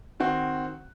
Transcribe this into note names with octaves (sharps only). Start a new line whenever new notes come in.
D#3 C4 F#4